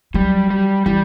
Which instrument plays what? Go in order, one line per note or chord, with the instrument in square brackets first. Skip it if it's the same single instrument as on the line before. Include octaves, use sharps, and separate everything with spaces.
[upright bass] F#3 [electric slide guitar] G3
[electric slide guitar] G3
[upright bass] E3 [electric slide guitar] G3